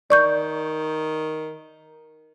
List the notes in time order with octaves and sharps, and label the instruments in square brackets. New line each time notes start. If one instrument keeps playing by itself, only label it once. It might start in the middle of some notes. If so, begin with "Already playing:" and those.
[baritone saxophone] D#3 [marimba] D5 C#6 G6